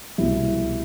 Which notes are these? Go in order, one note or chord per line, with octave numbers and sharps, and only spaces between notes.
C2 B2 A3 E4